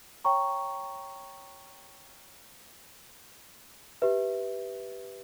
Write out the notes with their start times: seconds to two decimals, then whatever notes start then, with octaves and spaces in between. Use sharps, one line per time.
0.25 C#5 G5 A#5 C#6
4.02 G4 B4 E5